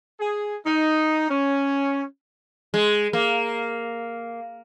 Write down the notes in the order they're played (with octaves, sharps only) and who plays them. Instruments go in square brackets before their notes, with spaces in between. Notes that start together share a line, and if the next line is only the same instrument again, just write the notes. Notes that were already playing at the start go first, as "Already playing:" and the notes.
[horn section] G#4
D#4
C#4
[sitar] G#3
A#3